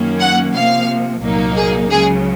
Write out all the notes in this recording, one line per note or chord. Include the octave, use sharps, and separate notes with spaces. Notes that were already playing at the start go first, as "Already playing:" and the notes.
Already playing: F#2 D#3 A#3 C#4
F#5
C3 F3 A#3 F5
C2 A#2 F#3 A#3 D#4
G#4
C#2 C#3 F#3 G#4